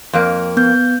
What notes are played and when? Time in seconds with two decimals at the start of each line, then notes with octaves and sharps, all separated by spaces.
0.13 F2 A#3
0.57 B3 G6